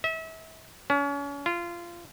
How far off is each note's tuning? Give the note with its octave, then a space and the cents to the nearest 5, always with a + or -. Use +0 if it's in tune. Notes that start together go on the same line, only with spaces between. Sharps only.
E5 -35
C#4 +35
F4 -20